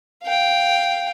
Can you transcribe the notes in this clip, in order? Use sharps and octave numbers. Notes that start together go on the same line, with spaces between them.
F5 G5